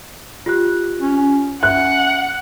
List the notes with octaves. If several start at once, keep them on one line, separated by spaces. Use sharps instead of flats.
F4 G4 F#6
C#4
C#4 E5 F#5 F#6